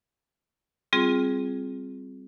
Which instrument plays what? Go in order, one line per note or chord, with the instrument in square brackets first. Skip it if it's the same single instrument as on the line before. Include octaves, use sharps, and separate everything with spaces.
[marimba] G3 C4 F4 G#4